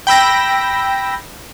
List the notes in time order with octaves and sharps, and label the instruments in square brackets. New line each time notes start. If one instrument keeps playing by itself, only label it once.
[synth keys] G5 B5 E6 A#6